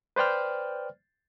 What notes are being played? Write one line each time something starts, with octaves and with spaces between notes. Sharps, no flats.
B4 C5 D5 G5 F6